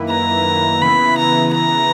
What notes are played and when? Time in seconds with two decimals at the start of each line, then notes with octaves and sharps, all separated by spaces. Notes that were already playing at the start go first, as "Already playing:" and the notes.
Already playing: F#2 D#3 A#3 E4 B4
0.09 A#5
0.81 C#3 E3 B3 E4 B4 B5
1.18 A#5
1.53 A#5